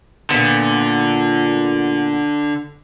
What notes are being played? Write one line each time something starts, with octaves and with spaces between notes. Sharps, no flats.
A#2 D3 B3